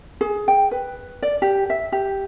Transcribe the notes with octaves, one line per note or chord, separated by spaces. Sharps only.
G#4
G5
B4
D5
G4
E5
G4